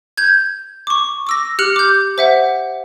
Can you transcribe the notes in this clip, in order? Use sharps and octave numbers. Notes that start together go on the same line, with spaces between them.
G6 G#6
C#6 D6
D6 E6 A#6
G4 F6 F#6 C#7 F#7
D6 G6
C5 E5 F#5